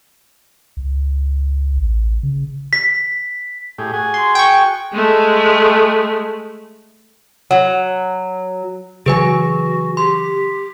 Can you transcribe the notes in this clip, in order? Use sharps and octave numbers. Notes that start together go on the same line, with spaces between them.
C#2
A1
C#3
B6
A2 G4 G#4
F#4 G#4 G#5
C6
G5 C#6
G#3 A3
F#3
C#3 E3 F#3 F#4 G#4 B4 G#5
G4 C6